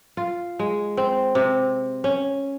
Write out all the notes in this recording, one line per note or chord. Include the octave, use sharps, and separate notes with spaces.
F4
G#3
C4
C3
C#4